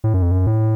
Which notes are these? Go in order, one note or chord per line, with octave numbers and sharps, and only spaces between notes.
A2
F#2
F2
F#2
A2